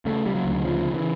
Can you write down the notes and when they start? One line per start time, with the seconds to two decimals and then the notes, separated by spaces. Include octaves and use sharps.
0.05 C#3 A3
0.26 C#3 G3
0.35 F#3
0.45 D2
0.64 C#3 F3
0.84 C#3
0.94 E3